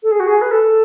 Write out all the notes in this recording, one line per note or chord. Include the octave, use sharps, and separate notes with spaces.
A4
G#4
F#4
G#4
B4
A4